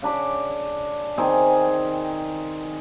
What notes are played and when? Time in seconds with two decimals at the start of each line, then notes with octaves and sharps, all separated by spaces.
0.02 C#3 D4 B5 D6
1.18 D#3 C4 G#4